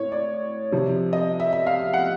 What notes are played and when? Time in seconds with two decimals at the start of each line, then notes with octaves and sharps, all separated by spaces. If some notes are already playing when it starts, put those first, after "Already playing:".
Already playing: A2 C#5
0.12 D5
0.72 C3 F3
1.13 D#5
1.40 E5
1.53 E5
1.67 F5
1.94 F#5